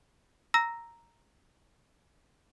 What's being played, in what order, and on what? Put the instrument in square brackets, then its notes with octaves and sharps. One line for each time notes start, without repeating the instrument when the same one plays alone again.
[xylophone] A#5 E6 A#6